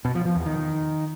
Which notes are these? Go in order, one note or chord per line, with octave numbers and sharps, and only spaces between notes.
B2
F3
F3
E2
D#3